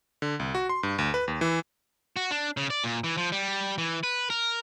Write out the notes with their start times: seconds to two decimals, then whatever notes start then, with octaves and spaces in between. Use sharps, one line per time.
0.22 D3
0.40 C2
0.55 F#4
0.69 C6
0.83 G2
0.98 D2
1.14 B4
1.28 D#2
1.41 E3
2.16 F#4
2.31 D4
2.57 C#3
2.70 D5
2.84 A#2
3.04 E3
3.17 F3
3.32 G3
3.78 E3
4.03 B4
4.30 A#4